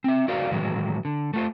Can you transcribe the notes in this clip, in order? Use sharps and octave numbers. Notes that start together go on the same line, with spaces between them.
C4 E5
D#4 F#4 A#4 C5 D5 F5
A2 D#3 E3 F#3 G#3
D3
A3 F4 C5